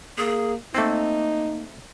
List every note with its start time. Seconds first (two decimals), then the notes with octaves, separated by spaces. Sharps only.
0.18 A#3 G#4
0.75 A3 A#3 C4 D#4